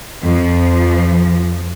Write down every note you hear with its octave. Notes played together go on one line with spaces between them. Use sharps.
F2 F3